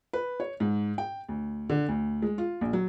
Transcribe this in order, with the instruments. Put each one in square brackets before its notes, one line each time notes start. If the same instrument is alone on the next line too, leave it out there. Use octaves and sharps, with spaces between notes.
[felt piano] B4
C#5
G#2
G5
D2
D3
D2
G#3
F4
A#1
F#3